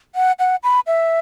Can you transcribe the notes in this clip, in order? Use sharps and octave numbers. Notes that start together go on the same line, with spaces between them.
F#5
F#5
B5
E5